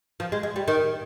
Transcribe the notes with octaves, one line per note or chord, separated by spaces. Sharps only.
F3
G#3
G#3
G3
D#3